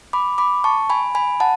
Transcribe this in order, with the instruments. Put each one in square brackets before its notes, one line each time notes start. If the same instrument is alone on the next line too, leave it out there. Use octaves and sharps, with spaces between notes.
[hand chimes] B5 D6
B5 D6
A5 C#6
G#5 B5
G#5 B5
F#5 A5